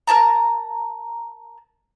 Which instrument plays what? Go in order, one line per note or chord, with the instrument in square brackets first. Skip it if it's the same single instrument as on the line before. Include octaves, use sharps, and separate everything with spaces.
[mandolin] A#4 D#5 A5 A#5